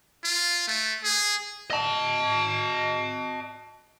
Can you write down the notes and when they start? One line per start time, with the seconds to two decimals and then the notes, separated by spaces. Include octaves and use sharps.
0.24 F4
0.67 A3
1.04 G#4
1.70 D#5 A5